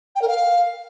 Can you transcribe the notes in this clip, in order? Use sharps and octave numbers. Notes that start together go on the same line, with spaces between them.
G5
A#4
F5